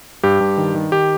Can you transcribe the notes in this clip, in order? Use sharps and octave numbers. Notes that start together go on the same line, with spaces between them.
G2 G4
G2
D#3
D#3
D#3 G4